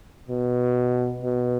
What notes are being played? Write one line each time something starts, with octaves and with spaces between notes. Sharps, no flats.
B2
B2